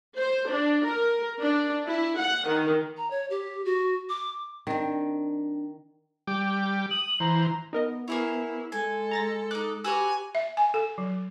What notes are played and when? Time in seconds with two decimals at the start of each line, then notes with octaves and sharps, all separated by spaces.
0.17 C5
0.49 D4
0.86 A#4
1.42 D4
1.88 E4
2.18 F#5
2.48 D#3
2.97 A#5
3.10 C#5
3.30 G4
3.65 F#4
4.09 D6
4.67 D#3 C4 D4
6.27 G3 G5 D6
6.91 D#6 F#7
7.20 E3 C5 A#5
7.73 B3 D#4 A#4 D#5
8.08 A#3 E4 G#4 C#5
8.72 G#3 A4 G#5
9.11 A#5 A6 A#6
9.51 D#4 D6 F#6
9.84 F#4 G4 B4 C#5 G#5 E6
10.35 E5
10.57 G#5
10.74 A4
10.98 F#3